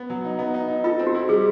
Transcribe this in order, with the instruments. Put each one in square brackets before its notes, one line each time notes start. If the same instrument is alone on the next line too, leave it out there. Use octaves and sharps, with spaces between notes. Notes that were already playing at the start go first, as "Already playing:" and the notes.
Already playing: [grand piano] B3
F#3
D#4
B3
D#4
D#4
[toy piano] F4 [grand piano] A4
[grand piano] C4
[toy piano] F#4
[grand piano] E4
[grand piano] G3 [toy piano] G#4